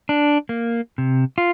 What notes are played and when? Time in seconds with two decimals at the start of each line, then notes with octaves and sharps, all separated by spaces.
0.09 D4
0.49 A#3
0.98 C3
1.38 F4